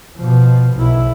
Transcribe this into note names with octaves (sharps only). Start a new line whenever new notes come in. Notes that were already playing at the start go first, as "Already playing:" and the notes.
B2 F3
B1 E4